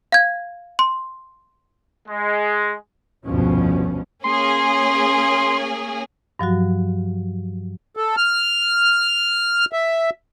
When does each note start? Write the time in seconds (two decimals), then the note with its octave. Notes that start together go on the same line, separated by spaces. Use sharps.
0.12 F5 G#6
0.79 C6
2.09 G#3
3.24 F1 D2 G2 B2 F3 C#4
4.24 A#3 C#4 G#4 C6
6.39 G2 F3 F#3 F#4
7.97 A4
8.17 F6
9.73 E5